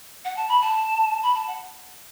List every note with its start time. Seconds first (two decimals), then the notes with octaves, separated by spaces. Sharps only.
0.25 F#5
0.37 A5
0.49 B5
0.61 A5
1.23 B5
1.34 A5
1.47 F#5